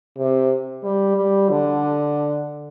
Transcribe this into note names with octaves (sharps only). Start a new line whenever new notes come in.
C3
G3
G3
D3